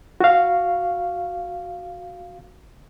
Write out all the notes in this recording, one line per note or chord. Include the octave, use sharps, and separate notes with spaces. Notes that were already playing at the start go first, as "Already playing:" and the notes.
F#4 F5